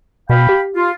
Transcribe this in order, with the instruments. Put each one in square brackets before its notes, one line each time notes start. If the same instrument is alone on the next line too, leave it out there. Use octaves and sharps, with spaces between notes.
[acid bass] B2 [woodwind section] F5 G5 B5
[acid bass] G4
[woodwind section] F4